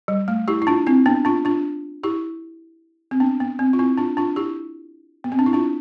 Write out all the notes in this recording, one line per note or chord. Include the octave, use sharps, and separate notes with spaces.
G3
A3
E4 G4
E4
D4 F4
C4 E4
B3 D4
D4 F4
D4 F4
E4 G4
C4
B3 D4
B3
C4
F4
C4 E4
D4 F4
D4 F4
E4 G4
B3
C4
D4
E4
D4 F4